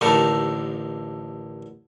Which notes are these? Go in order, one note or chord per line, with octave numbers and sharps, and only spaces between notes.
A1 D#2 D3 A3 A4 A#4